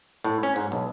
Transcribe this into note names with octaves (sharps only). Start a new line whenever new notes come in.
A2
C#4
G#2
B1